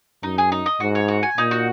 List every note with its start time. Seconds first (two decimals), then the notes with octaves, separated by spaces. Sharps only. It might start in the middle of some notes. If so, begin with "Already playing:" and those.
0.23 F#2 D#4
0.38 G#4
0.52 D#4
0.66 D#5
0.80 G#2 F#4
0.95 C#5
1.08 F#4
1.23 G#5
1.37 A#2 D#4
1.51 F#4